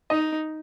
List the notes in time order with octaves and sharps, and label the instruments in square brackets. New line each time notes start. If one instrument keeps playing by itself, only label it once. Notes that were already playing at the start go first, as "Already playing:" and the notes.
[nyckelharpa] D#4 [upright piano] D#5